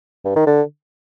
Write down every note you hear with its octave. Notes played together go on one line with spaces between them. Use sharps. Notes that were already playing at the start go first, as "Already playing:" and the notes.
G2
D#3
D3